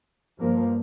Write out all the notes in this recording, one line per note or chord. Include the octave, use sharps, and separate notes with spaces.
G2 F3 A#3